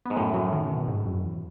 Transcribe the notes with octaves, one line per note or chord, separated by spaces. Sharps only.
G#2 B3
F#2 A2 A3
F#3
D#3
C#3
B2
G#2
F#2
E2